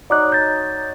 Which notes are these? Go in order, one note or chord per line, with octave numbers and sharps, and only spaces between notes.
F#3 D#4 D5 D6 F#6
G6 A6